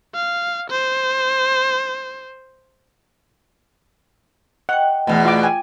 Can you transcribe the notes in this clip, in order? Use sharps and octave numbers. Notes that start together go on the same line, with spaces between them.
F5
C5
D#5 F#5 G5
E2 B2 A3
F4 D6
G5 G#5